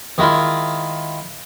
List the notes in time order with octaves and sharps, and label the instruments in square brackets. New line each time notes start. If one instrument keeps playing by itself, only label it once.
[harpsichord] D#3 G#3 E4 F4